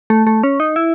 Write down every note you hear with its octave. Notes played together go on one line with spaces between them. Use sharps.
A3
A3
C#4
D#4
E4